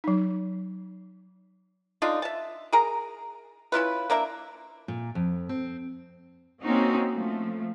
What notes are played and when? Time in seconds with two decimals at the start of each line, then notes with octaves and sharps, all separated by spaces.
0.04 F#3 D#4
2.02 D3 D4 D#4 F4
2.22 E5 A5
2.73 G#4 A#4 A#5
3.72 C#4 E4 F4 B4
4.10 A#3 D4 A#4 E5
4.88 A#2
5.15 F2
5.49 C4
6.63 A#3 C4 C#4 D#4 F#4
7.14 F3 A3